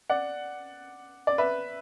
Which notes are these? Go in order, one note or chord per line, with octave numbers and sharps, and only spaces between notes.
D5 F#5
D5
B4 E5